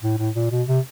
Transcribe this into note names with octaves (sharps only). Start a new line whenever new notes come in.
A2
A2
A#2
B2
C3